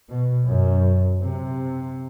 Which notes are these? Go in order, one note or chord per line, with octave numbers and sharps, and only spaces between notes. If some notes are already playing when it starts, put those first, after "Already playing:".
B2
F#2
C3